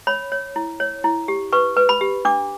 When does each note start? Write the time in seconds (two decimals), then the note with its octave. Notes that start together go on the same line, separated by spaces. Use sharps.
0.07 C#5 B5
0.32 C#5
0.56 E4
0.80 C#5
1.04 E4
1.28 G4
1.53 B4 C#6
1.77 B4
1.89 B5
2.01 G4
2.25 D4 D6